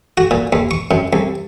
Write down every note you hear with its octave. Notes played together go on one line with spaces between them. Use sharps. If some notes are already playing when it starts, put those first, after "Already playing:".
F#4
A#2
D#2
C#6
F#2
C2